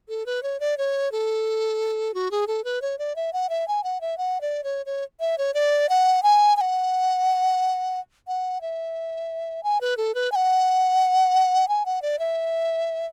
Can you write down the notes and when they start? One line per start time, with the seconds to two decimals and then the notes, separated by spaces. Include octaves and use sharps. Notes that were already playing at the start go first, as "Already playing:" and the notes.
0.09 A4
0.26 B4
0.43 C#5
0.60 D5
0.78 C#5
1.12 A4
2.14 F#4
2.31 G#4
2.47 A4
2.64 B4
2.82 C#5
2.98 D5
3.16 E5
3.33 F#5
3.49 E5
3.68 G#5
3.84 F#5
4.01 E5
4.18 F#5
4.41 D5
4.64 C#5
4.86 C#5
5.20 E5
5.38 C#5
5.54 D5
5.89 F#5
6.23 G#5
6.57 G#5
6.61 F#5
8.27 F#5
8.61 E5
9.63 G#5
9.81 B4
9.97 A4
10.15 B4
10.32 G#5
10.35 F#5
11.68 G#5
11.85 F#5
12.02 D5
12.19 E5